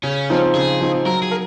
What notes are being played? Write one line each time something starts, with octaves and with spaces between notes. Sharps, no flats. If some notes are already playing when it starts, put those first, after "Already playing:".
C#3 C#4
F3 C4 D#4
C#3 G#4
F3 C4 D#4
F#3 A#4
G#4
A#4